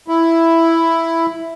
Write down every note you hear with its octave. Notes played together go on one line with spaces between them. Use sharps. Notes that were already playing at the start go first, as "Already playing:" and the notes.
E4